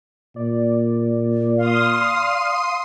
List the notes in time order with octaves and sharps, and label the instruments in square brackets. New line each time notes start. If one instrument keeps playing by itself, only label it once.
[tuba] A#2 [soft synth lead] D5
[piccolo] F5 [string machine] C6 D#6